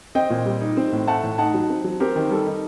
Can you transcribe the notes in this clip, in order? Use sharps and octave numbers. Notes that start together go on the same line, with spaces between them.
C4 D#5 G5
A#2
G3
D#4
C4
A2
A3 F#5 A5
A2
D#4 F#5 A5
F#3
C4
F#3
C4 G4 A#4
D#3
G3 A4
D#4